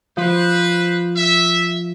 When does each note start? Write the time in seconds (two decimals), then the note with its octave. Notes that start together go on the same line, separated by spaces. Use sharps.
0.17 F3 B4 C5
1.15 E5